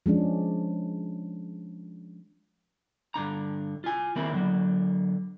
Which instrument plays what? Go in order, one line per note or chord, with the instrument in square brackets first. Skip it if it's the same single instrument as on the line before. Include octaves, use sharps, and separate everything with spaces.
[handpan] F3 G#3 C#4 D4
[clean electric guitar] G2 D3 D4 A#5
F4 G#5
D#3 A#3 C4 E4 A#4
D3 F#3 A#3